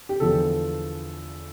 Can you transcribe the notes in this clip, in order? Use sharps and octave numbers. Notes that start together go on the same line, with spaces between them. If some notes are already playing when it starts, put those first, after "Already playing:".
G4
E2 D3 F3 A4